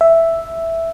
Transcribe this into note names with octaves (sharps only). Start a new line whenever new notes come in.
E5